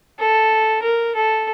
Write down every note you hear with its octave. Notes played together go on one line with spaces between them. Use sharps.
A4
A#4
A4